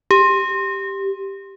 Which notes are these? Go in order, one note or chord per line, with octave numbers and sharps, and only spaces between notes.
G4